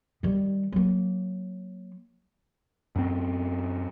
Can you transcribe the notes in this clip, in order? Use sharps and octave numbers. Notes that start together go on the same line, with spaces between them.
D#3 G3
F#3 A#3
F#2 C4